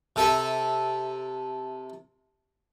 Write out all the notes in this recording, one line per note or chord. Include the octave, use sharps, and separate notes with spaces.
C3 A4 E5